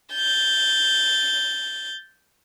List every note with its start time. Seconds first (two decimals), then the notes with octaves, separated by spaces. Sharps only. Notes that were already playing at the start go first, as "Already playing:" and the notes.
0.13 G6 A6